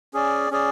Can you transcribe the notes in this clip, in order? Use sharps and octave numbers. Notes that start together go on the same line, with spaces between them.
C#4 G#4 D5
C#4 G#4 D5